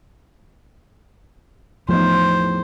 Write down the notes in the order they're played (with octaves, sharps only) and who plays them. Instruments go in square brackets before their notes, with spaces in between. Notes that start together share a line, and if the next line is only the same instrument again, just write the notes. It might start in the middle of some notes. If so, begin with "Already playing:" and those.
[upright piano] E2 A2 D#4 [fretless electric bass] F3 [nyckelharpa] C5